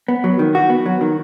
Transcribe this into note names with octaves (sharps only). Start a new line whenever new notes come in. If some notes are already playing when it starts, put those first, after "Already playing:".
B3
F#3
D#3
F#4
B3
F#3
D#3